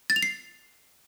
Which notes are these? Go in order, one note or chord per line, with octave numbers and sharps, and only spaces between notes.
A6
F7
C7